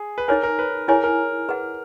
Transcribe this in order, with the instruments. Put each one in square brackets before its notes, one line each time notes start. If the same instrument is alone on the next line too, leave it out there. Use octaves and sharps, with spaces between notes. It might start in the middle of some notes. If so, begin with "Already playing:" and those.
Already playing: [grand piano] G#4
B4
[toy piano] D#4 G#4 C#5 G#5 [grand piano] A#4
[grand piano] A#4
B4
[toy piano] E4 G#4 C#5 G#5 [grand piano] A#4
[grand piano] A#4
[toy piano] G#4 B4 F#5